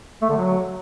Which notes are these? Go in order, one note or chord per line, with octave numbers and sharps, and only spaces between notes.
A3
D3
F#3